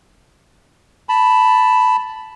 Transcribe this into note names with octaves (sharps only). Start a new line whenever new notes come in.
A5 B5